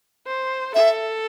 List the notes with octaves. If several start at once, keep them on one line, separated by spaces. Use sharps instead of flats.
C5
A4 E5